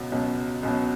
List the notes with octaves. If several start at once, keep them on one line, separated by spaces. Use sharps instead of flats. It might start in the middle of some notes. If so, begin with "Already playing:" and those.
Already playing: C#2 B2 F#3
C#2 B2 F#3
C#2 B2 F#3